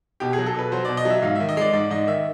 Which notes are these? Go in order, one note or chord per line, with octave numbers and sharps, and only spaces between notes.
B2 G4
F#3 G#4
A4
B2 B4
F#3 C5
B2 D5
D#5
F#3 E5
G#2 F5
D#3 E5
D#5
G#3 D5
G#2 D5
G#2 D#5
D#3 E5